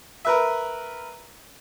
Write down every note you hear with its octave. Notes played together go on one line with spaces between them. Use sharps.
A#4 B4 E5